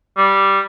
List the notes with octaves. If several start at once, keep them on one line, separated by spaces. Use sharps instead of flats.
G3